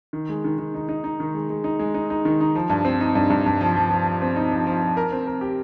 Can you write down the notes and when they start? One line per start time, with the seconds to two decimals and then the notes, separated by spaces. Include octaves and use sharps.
0.13 D#3
0.29 G#3
0.44 D#3
0.58 D#3
0.74 D#4
0.89 D#4
1.04 D#4
1.20 D#3
1.34 G#3
1.50 G#3
1.64 D#4
1.79 G#3
1.94 D#4
2.10 D#4
2.25 D#3
2.41 D#4
2.55 F3
2.70 G2
2.85 C4
3.00 D#4
3.15 G2
3.30 G2
3.46 G2
3.61 F3
3.76 F3
3.90 F3
4.06 F3
4.22 C4
4.36 D#4
4.52 F3
4.67 F3
4.82 F3
4.97 A#4
5.12 C4
5.27 A#4
5.41 G4